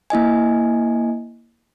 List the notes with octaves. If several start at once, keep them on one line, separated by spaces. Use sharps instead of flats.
A#3 E4 D#5 G#5